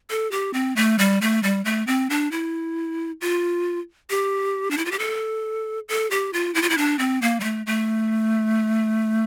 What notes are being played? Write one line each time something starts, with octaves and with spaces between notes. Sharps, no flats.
A4
G4
C4
A3
G3
A3
G3
A3
C4
D4
E4
F4
G4
D4
E4
F4
G4
A4
A4
G4
F4
E4
F4
E4
D4
C4
A#3
G3
A3
A3